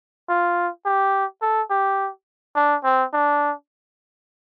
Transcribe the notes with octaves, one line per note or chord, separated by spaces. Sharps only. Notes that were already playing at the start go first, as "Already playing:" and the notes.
F4
G4
A4
G4
D4
C4
D4